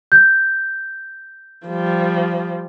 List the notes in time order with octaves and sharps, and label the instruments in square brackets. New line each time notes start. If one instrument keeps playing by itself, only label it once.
[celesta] G6
[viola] F3 G3